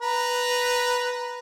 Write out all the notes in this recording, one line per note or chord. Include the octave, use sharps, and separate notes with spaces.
B4 A#5